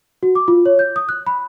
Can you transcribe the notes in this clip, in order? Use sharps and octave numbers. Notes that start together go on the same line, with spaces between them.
F#4
D6
F4
C#5
G6
D#6
F#6
B5